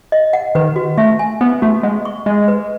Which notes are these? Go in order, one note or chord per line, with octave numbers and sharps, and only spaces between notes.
D#5
F#5
D#3 B4
F#4
A3 E5
G#5
B3 B4
A3 F#4
G#3 F#5
C#6
G#3 D#5
B4